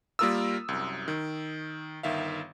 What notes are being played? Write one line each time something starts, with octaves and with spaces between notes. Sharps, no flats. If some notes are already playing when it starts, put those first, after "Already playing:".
G3 A#3 F4 A#4 D#6 E6
C2 F#2
D#3
G1 D#3 E5 F5